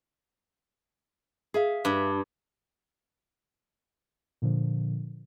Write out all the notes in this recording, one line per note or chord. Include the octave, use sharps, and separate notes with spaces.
G#4 E5 F5
G2
A#2 D3 F3